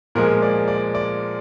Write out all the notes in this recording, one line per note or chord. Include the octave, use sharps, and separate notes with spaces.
A#2 F3 G#3 A#4
D5
D5
D5